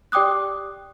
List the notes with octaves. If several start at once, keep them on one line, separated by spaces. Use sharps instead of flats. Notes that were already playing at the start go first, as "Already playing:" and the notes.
G4 D5 G5 D6 D#6 F#6